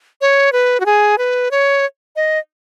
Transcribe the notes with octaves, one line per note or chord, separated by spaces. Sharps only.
C#5
B4
F#4
G#4
B4
C#5
D#5